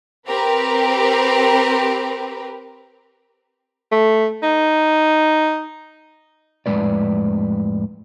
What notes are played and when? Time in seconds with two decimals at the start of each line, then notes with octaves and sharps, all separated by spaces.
0.27 C4 G4 A#4 B4
3.92 A3
4.43 D#4
6.66 F2 A2 F3 G#3 B4 D5